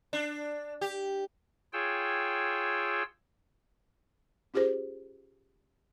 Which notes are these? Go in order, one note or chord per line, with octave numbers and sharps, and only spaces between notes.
D4
G4
F4 G#4 C#5 G5 E6
C#4 F4 G4 G#4 C5